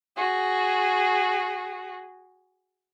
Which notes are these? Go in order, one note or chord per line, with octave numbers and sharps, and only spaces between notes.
F#4 G#4